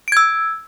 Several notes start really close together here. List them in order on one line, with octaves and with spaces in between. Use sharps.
D7 G#6 E6